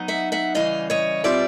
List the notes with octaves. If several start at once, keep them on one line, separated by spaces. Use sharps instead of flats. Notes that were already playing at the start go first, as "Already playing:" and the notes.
Already playing: F#3 B3 D#4
E5 F#5
E5 F#5
C#3 E3 G3 D#5 F5
C#5 D#5
B2 G3 C4 F4 D5 E5